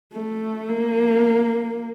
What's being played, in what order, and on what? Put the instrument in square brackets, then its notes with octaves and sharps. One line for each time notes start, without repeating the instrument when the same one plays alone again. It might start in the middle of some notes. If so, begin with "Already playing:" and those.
[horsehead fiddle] A3
A#3